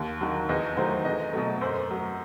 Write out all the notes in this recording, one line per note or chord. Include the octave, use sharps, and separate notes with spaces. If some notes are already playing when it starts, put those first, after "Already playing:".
Already playing: D#2
D#3 F#3
E2 D#5
D#3 F#3 A3 C5
E2 D#5
B2 F#3 A3
F#2 C5
F#3 A3